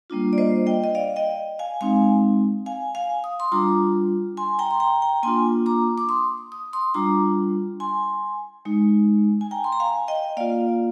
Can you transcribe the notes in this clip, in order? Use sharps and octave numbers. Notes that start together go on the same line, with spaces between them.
G3 A#3 D4 F4
D5
C5 D#5
D#5 G5
D#5
D5 F5
D#5 G5
F5 G#5
G#3 C4 D#4 F5 G#5
F5 G#5
F5 G#5
D#6
C6 D#6
G3 D4 F4 A#5 D6
G#5 C6
G5 A#5
C6
G5 A#5
G5 A#5
A#3 D4 F4 G#5 C6
A#5 D6
D6
C6 D#6
D#6
C6 D#6
G3 D4 F4 A#5 D6
G#5 C6
G#3 D#4
G#5
G5 A#5
C6
A#5
F5 G#5
D#5 G5
A#3 F4 D5 F5